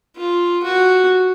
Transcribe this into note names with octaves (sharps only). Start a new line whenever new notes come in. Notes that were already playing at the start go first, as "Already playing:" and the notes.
F4
F#4